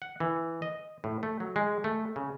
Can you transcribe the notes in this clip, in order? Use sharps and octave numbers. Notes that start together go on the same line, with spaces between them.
F#5
E3
D#5
A2
A3
F#3
G#3
A3
C#3